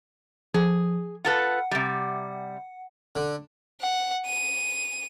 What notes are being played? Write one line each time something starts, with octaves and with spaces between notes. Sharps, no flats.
F3 G#4
F4 A4 B4 F#5
C3 G3
D3
F#5
D#7